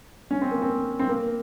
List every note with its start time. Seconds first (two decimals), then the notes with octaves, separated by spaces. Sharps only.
0.31 C#4
0.41 C4
0.51 A#3
0.62 C4
0.99 C4
1.09 A#3